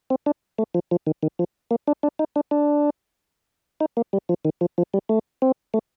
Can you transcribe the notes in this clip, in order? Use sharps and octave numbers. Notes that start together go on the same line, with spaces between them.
C4
D4
A3
F3
F3
D#3
D#3
F3
A#3
D4
D4
D#4
D4
D4
D#4
A#3
G3
F3
D#3
F3
F3
G3
A3
C4
A3